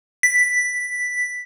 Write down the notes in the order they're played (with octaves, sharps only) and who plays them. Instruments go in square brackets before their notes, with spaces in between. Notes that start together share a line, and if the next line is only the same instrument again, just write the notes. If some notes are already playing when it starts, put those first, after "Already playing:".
[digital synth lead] B6